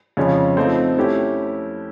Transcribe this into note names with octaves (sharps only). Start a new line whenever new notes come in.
F2 C#3 F3 G#3 C#4
F3 A3 C4 D#4
A3 C#4 E4 G4